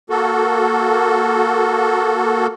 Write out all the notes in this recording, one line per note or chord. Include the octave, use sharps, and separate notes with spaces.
A#3 F#4 A4